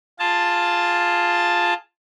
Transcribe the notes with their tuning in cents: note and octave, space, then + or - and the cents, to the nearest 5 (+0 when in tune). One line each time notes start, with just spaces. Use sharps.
F4 +0 G#4 +0 A5 +5